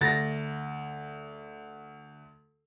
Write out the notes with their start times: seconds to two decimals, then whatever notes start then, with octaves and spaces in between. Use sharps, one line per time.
0.01 D2 A6 A#6